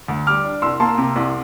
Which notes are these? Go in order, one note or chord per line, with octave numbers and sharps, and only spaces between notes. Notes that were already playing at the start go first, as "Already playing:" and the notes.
D2
G3 D6 F6
D4
C2 C6 E6
A#3 A5 C6
C3
C2